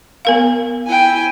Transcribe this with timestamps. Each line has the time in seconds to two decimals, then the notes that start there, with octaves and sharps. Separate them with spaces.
0.25 B3 A#4 F5
0.88 E4 G5 G#5